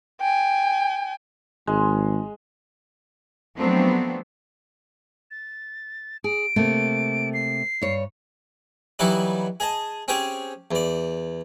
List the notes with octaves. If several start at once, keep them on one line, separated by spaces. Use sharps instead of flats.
G5 G#5
G#1 G#3
F3 F#3 A3 B3 C4 D4
A6
G#4 D7
C3 A3 A#3
C7
G2 C#5
E3 F#3 G3 D#4 E4 F#4
G#4 D#5 A5
C4 C#4 G4 G#4 G5
E2 D5